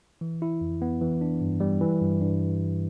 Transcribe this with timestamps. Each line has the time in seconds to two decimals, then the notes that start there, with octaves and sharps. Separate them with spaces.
0.21 E3
0.42 E4
0.61 F2
0.82 B3
1.02 E3
1.21 D4
1.41 G2
1.60 G3
1.81 E3
2.01 G2
2.21 G2